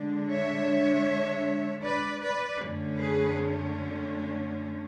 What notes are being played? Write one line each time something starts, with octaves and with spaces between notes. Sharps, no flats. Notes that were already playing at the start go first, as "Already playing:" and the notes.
Already playing: D3 G#3 D4
C#5 E5
B4 D5
B4 D5
F#2 D3 A3 C#4
G#4 B4